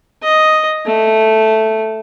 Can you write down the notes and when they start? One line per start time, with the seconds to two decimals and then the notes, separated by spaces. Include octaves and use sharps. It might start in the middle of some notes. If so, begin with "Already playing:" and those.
0.23 D#5
0.86 A3